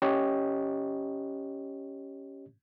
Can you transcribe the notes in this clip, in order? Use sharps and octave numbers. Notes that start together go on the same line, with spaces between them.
C#4 G4 C#5 D#5